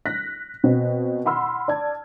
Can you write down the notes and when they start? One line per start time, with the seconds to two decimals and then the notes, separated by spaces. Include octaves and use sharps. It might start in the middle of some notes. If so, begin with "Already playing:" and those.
0.06 F#6 A#6 B6
0.64 B2 C4
1.25 F#5 B5 C6 E6 F6
1.68 D5 A5 G#6